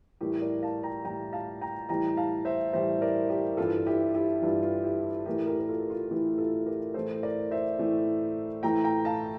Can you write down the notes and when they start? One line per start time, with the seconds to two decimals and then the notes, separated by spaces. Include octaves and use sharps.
0.21 A2 E3 G3 G4 A#4
0.42 A#4 D5
0.62 F5 A5
0.83 G5 A#5
1.05 A2 E3 G3 G5 A#5
1.33 F5 A5
1.61 G5 A#5
1.89 A2 E3 G3 G5 A#5
2.17 F5 A5
2.45 C5 E5
2.73 A2 E3 G3 C5 E5
3.01 A#4 D5
3.30 G4 A#4
3.57 G2 E3 G3 F4 A4
3.86 E4 G4
4.14 E4 G4
4.42 G2 E3 G3 F4
4.63 F4
4.84 E4 G4
5.26 A2 E3 A3 G4 A#4
5.47 G4 A#4
5.59 A#4
5.69 F4 A4
5.90 F4
6.11 A2 E3 A3 E4 G4
6.38 F4 A4
6.66 G4 A#4
6.94 A2 E3 A3 A4 C5
7.23 A#4 D5
7.51 C5 E5
7.79 A2 E3 A3
8.63 A2 E3 A3 G5 A#5
8.84 G5 A#5
9.05 F5 A5